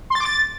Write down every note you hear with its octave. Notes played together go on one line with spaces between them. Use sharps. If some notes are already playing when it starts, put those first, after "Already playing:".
C6
A6
D6
A6